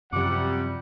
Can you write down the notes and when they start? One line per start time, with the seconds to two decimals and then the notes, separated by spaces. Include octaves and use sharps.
0.13 F#2 C3 F3 G3 F#5 D6